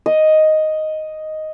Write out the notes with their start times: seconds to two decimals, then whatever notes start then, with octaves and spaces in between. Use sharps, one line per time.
0.06 D#5